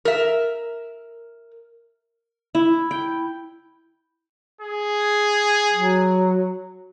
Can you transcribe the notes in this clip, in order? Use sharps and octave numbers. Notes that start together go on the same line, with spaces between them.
A#4 E5
E4
G5
G#4
F#3